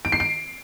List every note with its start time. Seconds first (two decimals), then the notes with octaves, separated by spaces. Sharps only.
0.05 D7
0.12 C7
0.20 D7